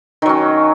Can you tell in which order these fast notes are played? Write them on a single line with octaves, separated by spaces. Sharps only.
D#3 F#3 C#4